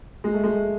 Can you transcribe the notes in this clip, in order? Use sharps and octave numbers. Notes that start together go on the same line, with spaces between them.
G#3
A3
G#3